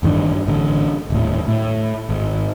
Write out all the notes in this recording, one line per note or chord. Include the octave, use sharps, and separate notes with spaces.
A1 G2 D#3 D4
A1 D3
D#1 A2
A2
G#1